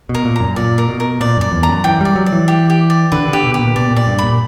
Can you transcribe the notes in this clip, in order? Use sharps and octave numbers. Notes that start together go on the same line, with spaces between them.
B2
A#4
A#2
F#2 A#5
A#2 D5
A#4
B2
A#4
A#2 D5
F#2 D5
E2
A#5
F#2
E3 G5
G3 D5
F#3
D5
E3
G4
G4
D5
D3 B4
D3
G4
B2
G4
A#2
B2 D5
A#2
D5
G2
B5
A#2